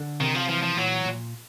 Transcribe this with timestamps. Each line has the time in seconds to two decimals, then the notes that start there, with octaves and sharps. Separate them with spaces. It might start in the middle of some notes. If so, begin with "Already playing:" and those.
Already playing: D3
0.21 C3 D#3
0.35 F3
0.49 E3 F3
0.63 F3
0.77 A#2 F#3
1.05 A#2